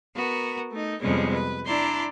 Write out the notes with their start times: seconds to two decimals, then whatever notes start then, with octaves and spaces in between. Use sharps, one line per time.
0.15 B3 F#4 A#4
0.71 A3 D#4
1.00 F2 C3 G3 G#3 B3 C#4
1.33 B4
1.65 D4 E4 D5 A#5 C6